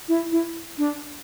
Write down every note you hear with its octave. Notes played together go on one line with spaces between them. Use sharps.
E4
E4
D4